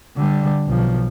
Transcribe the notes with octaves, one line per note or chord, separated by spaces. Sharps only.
D3 G3
B1 F3